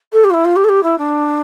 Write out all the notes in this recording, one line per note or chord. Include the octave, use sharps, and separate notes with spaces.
A4
G4
F4
E4
F4
G4
A4
G4
E4
D4